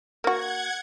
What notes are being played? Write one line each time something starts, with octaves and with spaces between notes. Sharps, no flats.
A#3 F#4 F#5 G#6